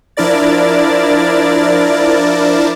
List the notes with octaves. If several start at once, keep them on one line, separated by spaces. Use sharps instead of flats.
F3 D4 E4 A#4 D5 A6